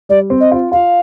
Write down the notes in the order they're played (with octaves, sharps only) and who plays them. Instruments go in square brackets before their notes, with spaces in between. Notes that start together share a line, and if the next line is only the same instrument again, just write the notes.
[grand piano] G3 [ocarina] D5
[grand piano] C4
[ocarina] D#5
[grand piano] F4
[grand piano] F4 [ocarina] F5